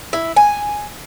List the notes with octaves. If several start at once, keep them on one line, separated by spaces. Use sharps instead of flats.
E4
G#5